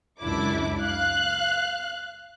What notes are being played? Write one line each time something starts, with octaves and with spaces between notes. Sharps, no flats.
C#2 F#2 D4 E4 D6
F5 F#6